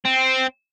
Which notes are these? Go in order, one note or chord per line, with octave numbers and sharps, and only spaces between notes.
C4